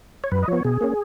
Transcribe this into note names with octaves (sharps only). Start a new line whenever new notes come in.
C#5
F#2 B4
D#5
F3 B3 C#5
B2 G#4
A#3 C#4